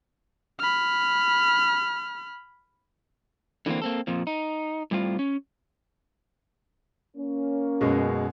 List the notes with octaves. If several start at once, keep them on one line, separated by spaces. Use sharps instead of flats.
B5 F6
D3 E3 F#3 A#3 C4
A#3 C4 A4
F2 A#2 F3
D#4
A2 G3 C4 F4
C#4
A#3 C#4
F#2 B2 G#3